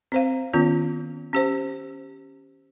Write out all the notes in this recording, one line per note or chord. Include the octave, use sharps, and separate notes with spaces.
C4 C5 F5
D#3 B3 C#4 F4
C#4 G4 C5